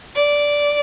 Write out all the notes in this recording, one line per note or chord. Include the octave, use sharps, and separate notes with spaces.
D5